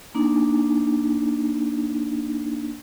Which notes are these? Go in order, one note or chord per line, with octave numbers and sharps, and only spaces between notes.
A#3 D4 D#4